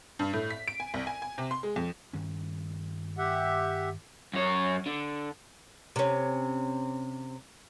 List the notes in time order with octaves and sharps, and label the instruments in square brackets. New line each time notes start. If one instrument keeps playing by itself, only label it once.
[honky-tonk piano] G2
A2
B6
D7
G#5
C2
G#5
G#5
C3
C6
G#3
F2
[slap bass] G2 D#3 C#4
[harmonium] G4 E5 F#5
[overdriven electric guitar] F#2 C#5
D3
[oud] C3 C#4